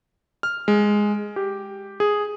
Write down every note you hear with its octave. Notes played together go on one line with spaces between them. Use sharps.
F6
G#3
G4
G#4